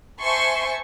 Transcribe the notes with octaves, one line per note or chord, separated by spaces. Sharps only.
C5 E5 G#5 A5 C6 C#6